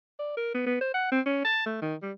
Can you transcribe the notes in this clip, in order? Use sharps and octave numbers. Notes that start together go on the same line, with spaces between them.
D5
A#4
B3
B3
C5
F#5
C4
C#4
A5
A3
D#3
G3